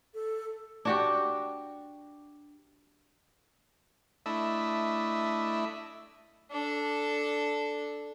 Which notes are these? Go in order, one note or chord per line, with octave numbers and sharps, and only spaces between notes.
A4
D4 F#4 G4
A3 D4 E4 D#5 E5
D4 A4